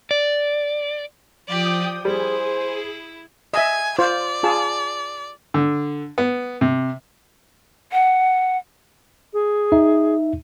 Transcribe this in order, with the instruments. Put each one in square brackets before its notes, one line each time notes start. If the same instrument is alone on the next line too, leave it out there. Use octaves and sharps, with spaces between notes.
[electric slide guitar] D5
[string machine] F3 G5 D#6 [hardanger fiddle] G4 D5
[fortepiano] G3 [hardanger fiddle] E4 [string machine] G#4 [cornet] C5
[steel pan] D#5 E5 [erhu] G#5
[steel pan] F4 C5 [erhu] D5
[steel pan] F4 G#4 A5
[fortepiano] D3
B3
C3
[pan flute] F#5
[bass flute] G#4
[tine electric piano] D#4 E5